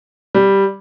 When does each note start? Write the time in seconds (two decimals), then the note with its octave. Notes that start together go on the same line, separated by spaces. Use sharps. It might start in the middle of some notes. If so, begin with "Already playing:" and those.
0.35 G3